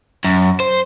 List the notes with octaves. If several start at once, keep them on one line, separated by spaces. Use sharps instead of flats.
F#2
C5